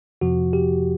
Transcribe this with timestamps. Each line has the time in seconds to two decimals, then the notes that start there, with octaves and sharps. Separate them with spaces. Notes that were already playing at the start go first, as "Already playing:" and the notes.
0.21 F2 C3 F3 F#4
0.53 G4